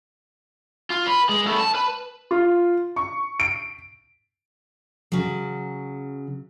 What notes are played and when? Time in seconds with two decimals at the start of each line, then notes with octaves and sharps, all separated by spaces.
0.90 F4
1.07 B4
1.29 G#3
1.47 A3 B3
1.59 A5
1.75 B4
2.31 F4
2.96 C#6
3.40 D7
5.12 C#3 F#3